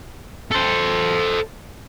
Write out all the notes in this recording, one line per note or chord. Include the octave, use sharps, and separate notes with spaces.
A4 C5